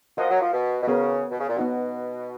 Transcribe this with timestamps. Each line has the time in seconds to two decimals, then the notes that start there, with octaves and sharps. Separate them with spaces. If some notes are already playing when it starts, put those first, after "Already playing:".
0.17 F3 F#4 A#4 D#5 F#5
0.30 F#3
0.41 F3
0.53 B2
0.82 B2
0.87 C#3 B3 F#4 A#4
1.31 B2
1.39 C#3
1.48 A#2
1.57 B2 B3 D#4 F#4